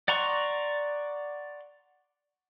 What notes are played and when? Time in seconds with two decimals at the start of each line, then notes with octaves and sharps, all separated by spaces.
0.08 D5 F#5 A#5 C6 C#6